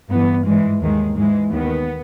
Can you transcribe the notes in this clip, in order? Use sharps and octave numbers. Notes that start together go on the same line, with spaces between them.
G2 E3 B3
G#2 E3 G#3
D#2 D#3 G#3
G#2 E3 G#3
D#2 D#3 B3